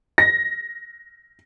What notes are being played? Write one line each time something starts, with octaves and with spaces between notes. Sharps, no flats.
A#6